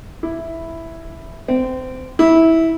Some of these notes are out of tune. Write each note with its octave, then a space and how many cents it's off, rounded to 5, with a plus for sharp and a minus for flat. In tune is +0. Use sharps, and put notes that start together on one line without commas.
E4 +0
C4 -25
E4 -15